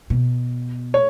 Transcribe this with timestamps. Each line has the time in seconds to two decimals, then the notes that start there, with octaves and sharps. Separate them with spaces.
0.10 B2
0.94 C#5